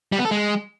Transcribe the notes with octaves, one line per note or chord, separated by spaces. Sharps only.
G3
B3
A4
G#3